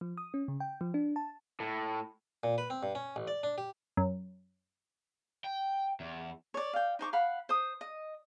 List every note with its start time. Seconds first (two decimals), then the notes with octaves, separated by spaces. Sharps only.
0.01 F3
0.17 D#6
0.34 C#4
0.48 C#3
0.60 G5
0.81 F3
0.94 D4
1.16 A5
1.60 A2
2.44 A#2
2.58 B4
2.70 C4
2.83 G2
2.95 C#4
3.16 A1
3.27 D5
3.43 D4
3.58 G4
3.97 F#2
5.44 G5
6.00 E2
6.54 C#5 D5
6.73 F5 G5
6.99 D#4 C5 C#6 D6
7.13 F5 F#5 B5
7.49 C5 D#6
7.81 D#5